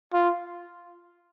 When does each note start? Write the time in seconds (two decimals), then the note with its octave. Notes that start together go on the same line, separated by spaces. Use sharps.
0.13 F4